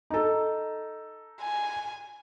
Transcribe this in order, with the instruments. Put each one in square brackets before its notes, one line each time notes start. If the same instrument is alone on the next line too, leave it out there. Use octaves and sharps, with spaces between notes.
[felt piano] D#4 A4
[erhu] G#5